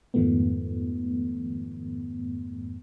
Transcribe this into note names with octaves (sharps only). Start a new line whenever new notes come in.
F2 G#2 D#3 F3 A3 B3